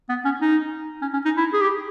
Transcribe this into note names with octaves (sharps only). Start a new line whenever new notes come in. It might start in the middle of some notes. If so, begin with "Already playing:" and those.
B3
C#4
D#4
C#4
C#4
D#4
E4
G#4
G4